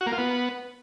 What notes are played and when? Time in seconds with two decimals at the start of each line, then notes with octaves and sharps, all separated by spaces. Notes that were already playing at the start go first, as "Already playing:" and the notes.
0.01 F#4
0.07 A#3
0.12 F4
0.18 B3